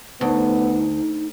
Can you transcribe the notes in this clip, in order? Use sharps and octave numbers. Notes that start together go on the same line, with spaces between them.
D2 B3 D#4